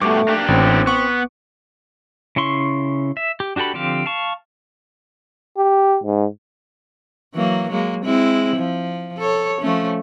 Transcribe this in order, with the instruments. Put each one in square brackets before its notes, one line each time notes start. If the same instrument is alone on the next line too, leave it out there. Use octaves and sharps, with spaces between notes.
[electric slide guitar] G2 B2 G3 [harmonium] A3 [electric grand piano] C#6 D6
[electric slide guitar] A#3 D4 G4
[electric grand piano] A1 [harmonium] C4
[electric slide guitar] B3 [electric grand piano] C#6
[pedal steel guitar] C#3 C#4 E4 C6 C#6
E5
G4
D4 F#4 G4 A4 B5
D3 F3 C4 G4 F5
F5 A5 C#6
[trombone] G4
G#2
[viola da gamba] E3 F#3 A#3
F#3 G#3 A#3
G#3 C4 E4
F3
A4 C#5
F3 A3 C#4